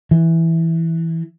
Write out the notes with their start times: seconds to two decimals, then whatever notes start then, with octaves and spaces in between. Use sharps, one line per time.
0.11 E3